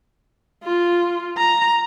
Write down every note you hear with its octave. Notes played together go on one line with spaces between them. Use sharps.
F4
A#5